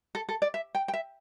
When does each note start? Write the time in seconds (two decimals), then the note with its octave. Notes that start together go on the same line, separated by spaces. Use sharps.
0.15 A4
0.29 A4
0.42 D5
0.54 E5
0.75 G5
0.88 G5
0.93 E5